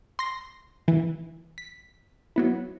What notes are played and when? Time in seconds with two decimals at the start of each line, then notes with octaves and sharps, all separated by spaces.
0.19 C6 A#6
0.88 E3
1.58 B6
2.36 F#3 B3 E4